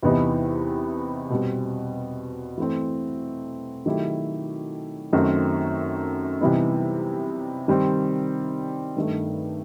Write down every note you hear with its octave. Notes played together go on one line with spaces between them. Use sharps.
E2 C3 E3 B3 D#4
B2 G3 C4
E3 A3 C4
D#3 F#3 A3 E4 G4
F#2 D#3 A3 C4 F#4
C3 E3 G3 B3 D#4
D#3 G3 C4
G2 D#3 A3